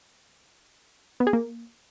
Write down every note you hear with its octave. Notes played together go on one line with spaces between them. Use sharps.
B3
G#4
A#3